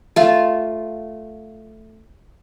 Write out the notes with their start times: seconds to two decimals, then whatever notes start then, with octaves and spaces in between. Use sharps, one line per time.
0.16 A3 F4